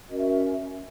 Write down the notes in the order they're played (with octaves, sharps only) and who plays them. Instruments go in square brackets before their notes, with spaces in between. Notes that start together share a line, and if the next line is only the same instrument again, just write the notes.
[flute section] C#4 F#4 A#4 D#5
E5
E5